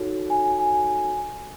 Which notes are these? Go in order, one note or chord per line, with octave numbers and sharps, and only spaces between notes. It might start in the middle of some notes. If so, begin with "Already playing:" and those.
Already playing: D#4 F#4 A4 C#5
G#5
G#5